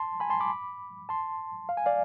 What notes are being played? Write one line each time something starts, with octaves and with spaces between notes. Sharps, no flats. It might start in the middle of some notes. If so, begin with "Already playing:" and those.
Already playing: A5 C6
G#5 B5
A5 C6
B5 D6
A5 C6
F5
G#5
D5 F5